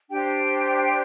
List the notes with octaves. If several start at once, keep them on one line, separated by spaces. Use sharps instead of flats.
D4 G4 C5 G5